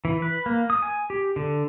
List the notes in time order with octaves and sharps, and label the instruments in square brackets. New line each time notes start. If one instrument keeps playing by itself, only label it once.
[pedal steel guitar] E3
B4
A#3
D#6
G#5
G4
D3